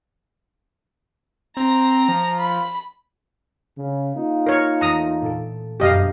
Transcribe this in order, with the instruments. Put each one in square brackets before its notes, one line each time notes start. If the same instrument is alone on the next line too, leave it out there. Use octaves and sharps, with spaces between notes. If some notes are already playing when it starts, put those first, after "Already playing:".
[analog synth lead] C4 [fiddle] A#5
[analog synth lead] F3
[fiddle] B5
[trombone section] C#3
A#3 D#4 F4
[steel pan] A#4 C#5
[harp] E2 A3 [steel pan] A#5 D#6
[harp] A#2 A4 D7
[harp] G1 F#2 B2 [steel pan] G4 D#5 F5